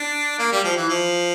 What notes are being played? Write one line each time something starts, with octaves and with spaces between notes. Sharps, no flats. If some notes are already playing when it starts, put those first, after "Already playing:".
Already playing: D4
A#3
G3
F3
E3
F3